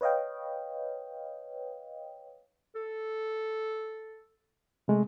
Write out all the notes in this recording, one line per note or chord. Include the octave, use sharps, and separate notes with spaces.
B4 C#5 D#5 F5 G5
A4
C3 G#3 A3